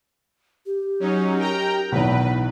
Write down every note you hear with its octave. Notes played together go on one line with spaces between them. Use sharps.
G4
F#3 C#4 D#4
A#4 G5 A#5
B1 E2 B4